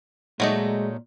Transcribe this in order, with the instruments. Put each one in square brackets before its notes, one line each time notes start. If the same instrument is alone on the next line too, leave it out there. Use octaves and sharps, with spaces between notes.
[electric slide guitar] A#2 D5 [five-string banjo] F#3 A3 D#4 [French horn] G#3